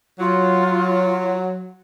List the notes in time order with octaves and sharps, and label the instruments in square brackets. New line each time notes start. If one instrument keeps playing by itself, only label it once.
[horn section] F#3 [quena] F4